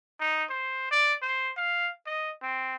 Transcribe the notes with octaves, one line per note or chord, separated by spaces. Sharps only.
D#4
C5
D5
C5
F5
D#5
C4